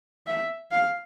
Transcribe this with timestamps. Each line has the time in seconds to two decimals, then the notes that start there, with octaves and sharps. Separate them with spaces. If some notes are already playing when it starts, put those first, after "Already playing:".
0.27 E5
0.71 F5